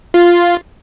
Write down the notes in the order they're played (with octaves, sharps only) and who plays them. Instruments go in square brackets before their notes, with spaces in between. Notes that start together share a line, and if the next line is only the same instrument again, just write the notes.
[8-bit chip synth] F4